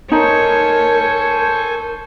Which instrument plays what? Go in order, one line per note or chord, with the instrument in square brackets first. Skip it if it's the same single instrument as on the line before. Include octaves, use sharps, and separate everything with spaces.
[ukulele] D#4 [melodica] A4 C5 G#5 [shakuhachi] A#4 [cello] C#5